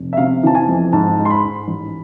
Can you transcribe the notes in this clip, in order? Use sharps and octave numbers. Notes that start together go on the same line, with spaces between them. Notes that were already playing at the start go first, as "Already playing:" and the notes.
Already playing: F1
E5
C3 F5
E3 A5
G#5
F2
G#2 A5
G#3
C6
B5
G#2
A1